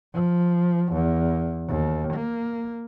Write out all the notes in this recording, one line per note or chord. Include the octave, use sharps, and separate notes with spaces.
F3
E2
D#2
A#3